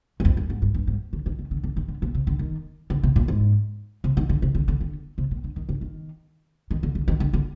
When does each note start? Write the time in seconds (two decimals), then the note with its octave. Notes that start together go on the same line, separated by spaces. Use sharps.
0.20 G2
0.25 F2
0.37 F2
0.50 G#2
0.62 G2
0.74 G2
0.87 G#2
1.13 D3
1.26 D#3
1.39 D3
1.51 D3
1.63 D3
1.77 D#3
1.88 D3
2.02 A#2
2.15 C3
2.27 D3
2.39 D#3
2.90 D3
3.03 C3
3.16 A#2
3.28 G#2
4.04 C3
4.17 D#3
4.29 D3
4.42 C3
4.55 D3
4.68 D3
4.81 D3
5.18 C3
5.31 A#2
5.44 D3
5.56 D#3
5.69 D3
5.81 D#3
6.71 D#3
6.83 D3
6.95 D3
7.08 D#3
7.20 D3
7.33 D3